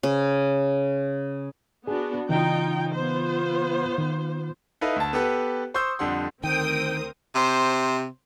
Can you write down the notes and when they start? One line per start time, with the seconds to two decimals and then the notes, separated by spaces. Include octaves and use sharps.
0.03 C#3
1.87 B3 D4 F#4 G#4
2.29 C#3 E3 D#4 F4 G5
2.93 B3 F4 C5
3.98 D#3
4.81 D#4 E4 A4 B4 D#5 F5
4.96 D2 A5
5.13 B3 G4 A4 B4
5.74 C5 C6 C#6 D#6 E6 G6
5.99 F2 D3 G3 F#5 C6
6.44 D2 D#3 C4 A#4 C5 G5 D#6
7.35 C3 C5